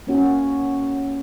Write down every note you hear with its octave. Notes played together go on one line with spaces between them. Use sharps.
A#3 C#4 F#4